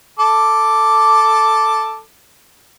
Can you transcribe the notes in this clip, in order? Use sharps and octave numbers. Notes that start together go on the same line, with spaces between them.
A4 D6